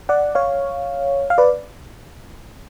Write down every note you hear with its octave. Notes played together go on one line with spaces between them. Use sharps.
D5 F#5
C#5 F5
F5
B4 D5